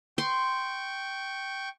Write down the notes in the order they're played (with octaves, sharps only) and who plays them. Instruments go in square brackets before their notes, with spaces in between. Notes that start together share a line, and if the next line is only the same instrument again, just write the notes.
[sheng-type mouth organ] G5 C#6 [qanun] C6